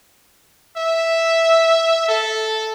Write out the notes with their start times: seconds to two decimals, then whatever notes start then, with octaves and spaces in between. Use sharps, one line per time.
0.77 E5
2.09 A4